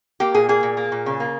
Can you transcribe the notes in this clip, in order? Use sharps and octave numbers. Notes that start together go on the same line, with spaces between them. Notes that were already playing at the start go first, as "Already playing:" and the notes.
A#3 G4
A#2 G#4
A#3 G#4
A#2
A#3
A#2
C#3
A#3